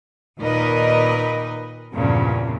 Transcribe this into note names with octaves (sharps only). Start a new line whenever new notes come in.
D#2 A#2 D#4 A#4 B4 D#5
E2 G2 A#2 C#3 F3